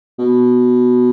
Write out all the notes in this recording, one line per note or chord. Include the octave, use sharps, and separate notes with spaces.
B2